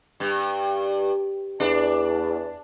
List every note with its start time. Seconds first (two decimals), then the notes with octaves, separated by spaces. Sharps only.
0.20 G2
1.60 E2 D4